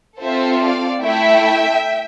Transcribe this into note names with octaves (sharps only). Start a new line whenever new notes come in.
C4 F4 A4 C5 E5
D5 F5
A3 E4 A4 E5 G5